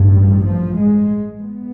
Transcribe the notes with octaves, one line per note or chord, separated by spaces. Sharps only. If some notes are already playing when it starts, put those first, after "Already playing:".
Already playing: A1 G2
G3
F3
G#3
B3